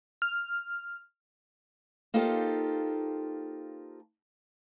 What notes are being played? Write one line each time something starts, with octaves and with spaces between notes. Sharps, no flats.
F6
A#3 D#4 F4 G4 A4 C5